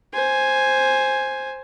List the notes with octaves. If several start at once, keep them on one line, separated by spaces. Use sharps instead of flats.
C5 G#5